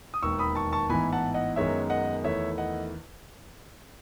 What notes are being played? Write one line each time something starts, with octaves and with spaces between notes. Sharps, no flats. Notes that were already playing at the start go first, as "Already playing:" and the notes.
D#6
E1 D#2 D#3 C#6 E6
B5 D#6
A5 C#6
A5 C#6
A1 G#2 E3 B3 G#5 B5
F#5 A5
D#5 F#5
F#2 D#3 G#3 B3 D#4 C#5 E5
D#5 F#5
E2 D#3 A3 E4 C#5 E5
D#5 F#5